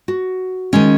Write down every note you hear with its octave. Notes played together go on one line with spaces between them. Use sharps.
F#4
D#3 G#3 C#4